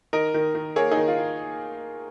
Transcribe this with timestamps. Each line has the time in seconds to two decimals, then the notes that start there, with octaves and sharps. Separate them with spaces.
0.13 D#3 A#4 D#5
0.34 D#3
0.55 D#3
0.76 A#3 G#4 C#5
0.91 D#4 G#4
0.97 D#3
1.08 F4
1.18 D#3